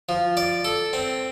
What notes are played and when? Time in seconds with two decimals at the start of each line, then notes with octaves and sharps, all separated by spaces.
0.09 F3
0.37 D5
0.65 A4
0.93 C4